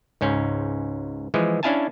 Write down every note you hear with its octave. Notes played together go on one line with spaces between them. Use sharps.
C#2 G#2 C#4
E3 F3 G#3
C#4 D4 E4 F5 G#5 A5